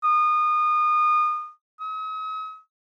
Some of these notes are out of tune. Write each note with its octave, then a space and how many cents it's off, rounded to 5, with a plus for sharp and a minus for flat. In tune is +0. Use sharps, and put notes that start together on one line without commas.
D#6 -30
D#6 +45